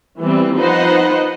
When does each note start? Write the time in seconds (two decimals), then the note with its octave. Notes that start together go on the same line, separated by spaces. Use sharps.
0.20 E3 G3 B3 C4
0.57 F3 D#4 B4 C5 D#5 F#5